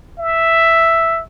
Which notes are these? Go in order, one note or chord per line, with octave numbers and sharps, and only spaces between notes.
E5